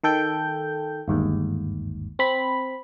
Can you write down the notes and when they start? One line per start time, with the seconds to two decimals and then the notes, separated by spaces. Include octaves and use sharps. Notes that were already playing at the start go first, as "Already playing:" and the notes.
0.04 D#3 A4 G5 G6
1.08 G1 D#2 G#2
2.19 C4 B5